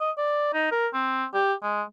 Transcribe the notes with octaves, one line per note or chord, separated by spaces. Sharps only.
D#5
D5
D#4
A#4
C4
G4
G#3